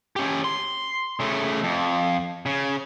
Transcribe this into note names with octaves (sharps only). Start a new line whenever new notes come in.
C#4 G4
C6
C#3 A3
F2
C#3